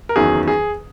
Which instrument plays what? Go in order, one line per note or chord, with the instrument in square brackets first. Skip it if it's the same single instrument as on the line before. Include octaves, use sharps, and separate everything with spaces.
[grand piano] A#4
F#1 E2 D#3 F#3 G#4
G#4